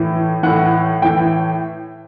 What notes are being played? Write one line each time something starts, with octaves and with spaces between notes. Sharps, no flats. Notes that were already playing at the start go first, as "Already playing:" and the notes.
Already playing: A2 E3
A2 E3 F#5
A2 E3 G5